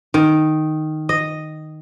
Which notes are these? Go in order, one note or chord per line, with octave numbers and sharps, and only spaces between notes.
D#3
D#5